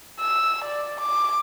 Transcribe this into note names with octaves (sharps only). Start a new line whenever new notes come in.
E6
D5
D6